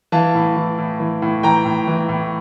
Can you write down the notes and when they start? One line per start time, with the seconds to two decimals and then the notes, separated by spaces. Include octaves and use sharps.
0.12 E3 F5 A5
0.35 A2
0.57 E3
0.78 A2
1.00 E3
1.22 A2
1.43 E3 G5 A#5
1.65 A2
1.88 E3
2.09 A2